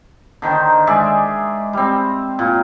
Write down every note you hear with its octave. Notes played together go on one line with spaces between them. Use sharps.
D3 D#3 D#4 C5
G#3 G#4 D5 E5
G3 C4
A#2